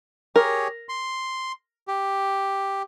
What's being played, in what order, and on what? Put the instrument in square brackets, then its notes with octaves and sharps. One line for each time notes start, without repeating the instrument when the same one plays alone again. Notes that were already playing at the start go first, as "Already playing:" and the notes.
[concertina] G4 G#4 C#5 [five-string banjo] A#4
[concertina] C6
G4